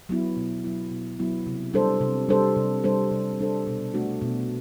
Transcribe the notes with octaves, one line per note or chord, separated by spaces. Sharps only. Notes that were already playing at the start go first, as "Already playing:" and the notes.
F#3 B3 E4
B2
F#3 B3 E4
B2
F#3 B3 E4
C3
G3 D4 A4 C5
C3
G3 D4 A4 C5
C3
G3 D4 A4 C5
C3
G3 D4 A4 C5
B2
A3 D4 F#4
B2